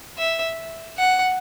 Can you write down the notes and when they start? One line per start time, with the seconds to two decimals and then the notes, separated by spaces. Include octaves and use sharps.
0.19 E5
0.98 F#5